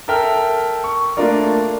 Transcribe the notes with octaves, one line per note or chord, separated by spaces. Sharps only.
A4 A#4 E5 G5 A#5 F6
C#6
A3 A#3 D4 F4 A#4 D5